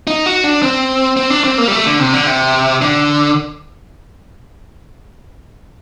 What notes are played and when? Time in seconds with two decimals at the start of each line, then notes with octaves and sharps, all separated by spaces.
0.07 D#4
0.26 F#4
0.44 D4
0.62 C4
1.17 C4
1.30 D4
1.44 C4
1.58 A#3
1.68 G3
1.72 A3
1.86 D3
1.99 C3
2.13 D3
2.26 C3
2.81 D3